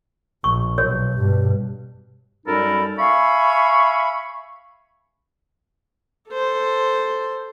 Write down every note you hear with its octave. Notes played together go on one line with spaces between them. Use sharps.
A#1 C#6
B1 C#5
G2 B2
F#2 G3 D#4 A4 A#4 B5
E5 F5 G#5 B5 C#6
A4 C5